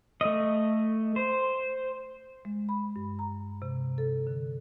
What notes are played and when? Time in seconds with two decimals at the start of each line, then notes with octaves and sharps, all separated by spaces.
0.21 A3 D#5
1.16 C5
2.45 G#3
2.69 B5
2.96 G2
3.19 A#5
3.62 C3
3.98 A4
4.27 D3